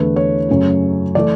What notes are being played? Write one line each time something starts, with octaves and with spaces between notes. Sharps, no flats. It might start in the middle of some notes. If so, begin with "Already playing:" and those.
Already playing: E2 D3 A3 B4
C#5
F#2 C#3 F#3 A3
E3 A3 D5